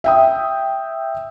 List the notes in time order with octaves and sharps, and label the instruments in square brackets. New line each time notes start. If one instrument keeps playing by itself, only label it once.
[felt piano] E5 G5 D#6